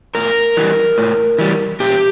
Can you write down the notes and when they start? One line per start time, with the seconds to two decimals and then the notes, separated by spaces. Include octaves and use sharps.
0.15 A2 A#4
0.57 E3 G3
0.98 A2
1.38 E3 G3
1.80 A#2 G4